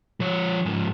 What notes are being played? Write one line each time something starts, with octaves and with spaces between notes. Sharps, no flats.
F3 C#5
G#2 F3